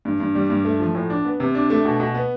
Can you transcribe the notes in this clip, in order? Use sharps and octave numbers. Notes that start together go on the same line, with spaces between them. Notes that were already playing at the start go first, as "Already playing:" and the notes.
G2
G2
G3
G2
A3
F3
A2
D4
B3
C3
D4
A3
B2
B2
B3